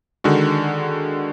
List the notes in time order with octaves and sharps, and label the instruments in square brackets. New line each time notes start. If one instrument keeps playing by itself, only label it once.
[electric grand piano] D3 D#3 G#3 F#4